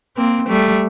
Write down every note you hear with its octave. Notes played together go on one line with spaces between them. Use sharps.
A#3 C4
G3 A3